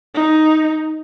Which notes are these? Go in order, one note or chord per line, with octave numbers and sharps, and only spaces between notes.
D#4